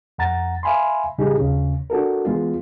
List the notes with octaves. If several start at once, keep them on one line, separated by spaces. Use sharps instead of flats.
F2 F#5 A#5 A6
E5 F5 G#5 B5 C6
A2 C#3 G3 D#4 G4 G#4
D#2 C#3
D4 F#4 A4 A#4
E3 G#3 B3 F4